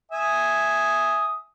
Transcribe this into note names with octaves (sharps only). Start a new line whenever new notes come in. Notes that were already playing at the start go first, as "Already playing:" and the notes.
E5 G#5 D#6